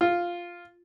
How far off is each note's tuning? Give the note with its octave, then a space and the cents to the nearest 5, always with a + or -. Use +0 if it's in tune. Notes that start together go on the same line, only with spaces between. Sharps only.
F4 +0